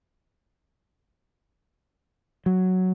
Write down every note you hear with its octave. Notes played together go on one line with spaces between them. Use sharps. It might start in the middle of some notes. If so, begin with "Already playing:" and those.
F#3